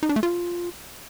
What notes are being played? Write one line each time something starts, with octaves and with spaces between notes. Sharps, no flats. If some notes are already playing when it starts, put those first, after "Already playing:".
D#4
D4
A3
F4